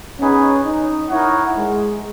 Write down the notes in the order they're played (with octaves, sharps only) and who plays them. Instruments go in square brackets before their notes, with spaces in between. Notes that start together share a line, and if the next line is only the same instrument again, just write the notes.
[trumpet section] B3 D#4 G#4 B4 [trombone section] C#4
[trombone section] D#4
[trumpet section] D#4 A#4 C#5 F#5 [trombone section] E4
[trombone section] G#3